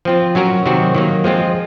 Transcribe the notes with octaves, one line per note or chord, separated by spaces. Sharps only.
F3 C4 F4
F#3 C#4 F#4 A#4
C3 D#3 F#3 C4 F#4
D#3 F#3 A#3
F3 G#3 C4 F4